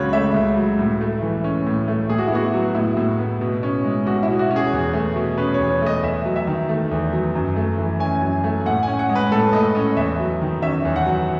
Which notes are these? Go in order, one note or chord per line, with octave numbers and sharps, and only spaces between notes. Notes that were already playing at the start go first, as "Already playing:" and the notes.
Already playing: C#2 C#3 F#3 F#4 B4 C#5
A3 E5
C#2
F#3
A2
A3
E3
C#4
A2
A3
A2 G#4
F#4
E4
B3 F#4
F#3
A2 E4
A2
B3
B2
C#4
G#3
B2 F#4
E4
B2
F#4
C#4
G#4
E2
A3
B2
C#4 B4
C#5
E2
A3 D#5
E2 E5
F#3
E5
D#3
A3
E2
F#3
F#2
A3
E3
C#4 G#5
F#2
A3
A2 F#5
C#4 G#5
F#5
G#3
B4
A2 A4
A2 D#5
C#4 D#5
E2 E5
F#3
D#3
C#4 E5
E2
F#5
F#3